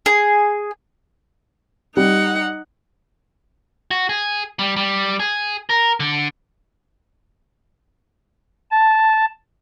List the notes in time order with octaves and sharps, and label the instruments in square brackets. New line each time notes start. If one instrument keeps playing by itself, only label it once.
[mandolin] G#4
[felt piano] G3 [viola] D#4 F#5
[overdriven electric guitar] F#4
G#4
G3
G3
G#4
A#4
D3
[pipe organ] A5